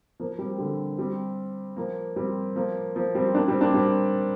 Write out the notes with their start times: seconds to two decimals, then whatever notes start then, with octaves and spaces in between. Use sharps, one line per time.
0.20 F3 A#3
0.39 G3 C4
0.58 D3 G3
0.98 G3 C4
1.76 F3 A#3
2.16 G3 C4
2.56 F3 A#3
2.95 F3 A#3
3.15 G3 C4
3.34 A#3 D4
3.48 G3 C4
3.61 A#3 D4
3.74 G3 C4